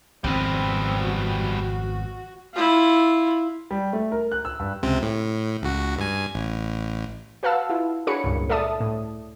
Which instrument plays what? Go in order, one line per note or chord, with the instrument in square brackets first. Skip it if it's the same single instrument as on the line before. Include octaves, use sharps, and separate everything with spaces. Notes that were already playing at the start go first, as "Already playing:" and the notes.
[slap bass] G#1 F2 B2 [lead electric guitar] G3 B3 [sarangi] C4
[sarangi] F#4
[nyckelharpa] E4 F4
[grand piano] G3
A3
A#4
F#6
E6
G2
[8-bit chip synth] C#2 C3 C4
A2
C#2 F#4
G2 G#5
A1
[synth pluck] F#4 B4 F5 F#5 A5 E6
E4 F4
D4 F#4 G#4 C#5 B5 C#7
C#2 G2 A#2
A4 D5 E5 A5 D#6
A2